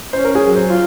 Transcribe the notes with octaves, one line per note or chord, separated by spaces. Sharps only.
C#4 C5
A#4
G#4
F#3
C5
F4